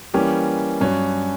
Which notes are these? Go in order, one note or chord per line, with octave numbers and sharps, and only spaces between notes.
E3 G3 A#3 C#4 G4
G2 F#3 C#4